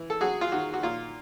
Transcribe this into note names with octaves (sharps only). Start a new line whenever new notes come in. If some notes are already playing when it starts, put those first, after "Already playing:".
Already playing: E3
A4
F#3 F#4 G#4
F4
D#3 F#4
F#4
A#2 F4